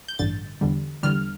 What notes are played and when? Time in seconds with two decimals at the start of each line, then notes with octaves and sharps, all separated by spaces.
0.08 G6
0.19 A1 G2 D3 A6
0.61 E2 D3 G3
1.03 E2 D3 G3 F6